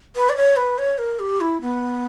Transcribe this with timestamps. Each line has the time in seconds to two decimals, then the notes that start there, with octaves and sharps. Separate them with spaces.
0.16 B4
0.29 D5
0.36 C#5
0.56 B4
0.78 C#5
0.98 A#4
1.19 G4
1.41 E4
1.61 B3